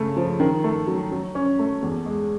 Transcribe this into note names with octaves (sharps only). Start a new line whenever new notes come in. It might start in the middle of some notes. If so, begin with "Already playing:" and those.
Already playing: C#3 A3
F3
D#3
A3
F#3
F#3
C#4
A3
E2
G#3